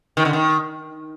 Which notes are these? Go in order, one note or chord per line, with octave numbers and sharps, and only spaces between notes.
D#3
D3
D#3